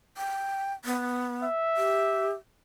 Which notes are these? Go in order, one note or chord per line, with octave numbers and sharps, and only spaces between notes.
G5
B3
E5
G4